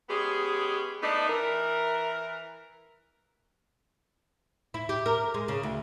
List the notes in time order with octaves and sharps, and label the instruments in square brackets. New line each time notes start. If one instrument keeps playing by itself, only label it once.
[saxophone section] G#3 B3 C#4 G4 G#4
A3 B3 D4 D#4
E3 A#4
[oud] E4
G4
A#4
G#3
C#3
D2